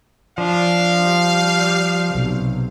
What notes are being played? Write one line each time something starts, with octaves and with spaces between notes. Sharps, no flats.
F3 D4 F5
G3
B1 C3